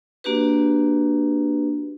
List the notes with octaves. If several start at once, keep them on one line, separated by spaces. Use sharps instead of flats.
A#3 D4 F#4 G4 B4